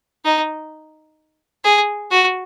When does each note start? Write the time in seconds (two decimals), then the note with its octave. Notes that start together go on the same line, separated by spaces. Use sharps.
0.25 D#4
1.65 G#4
2.11 F#4